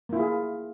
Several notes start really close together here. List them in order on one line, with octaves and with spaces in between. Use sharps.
A#3 E4 F4 G#4